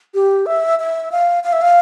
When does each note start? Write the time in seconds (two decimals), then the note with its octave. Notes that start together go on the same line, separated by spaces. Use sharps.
0.15 G4
0.46 E5
0.79 E5
1.12 F5
1.44 F5
1.53 E5
1.61 F5